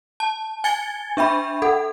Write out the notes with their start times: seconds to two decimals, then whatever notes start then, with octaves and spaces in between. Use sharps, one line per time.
0.20 A5
0.64 G#5 G#6 A6 C#7 G7
1.17 D4 E5 G5 B5
1.62 A4 F#5